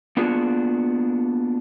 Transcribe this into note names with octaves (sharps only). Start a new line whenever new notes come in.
A#3 B3 D4 F4 F#4 G#4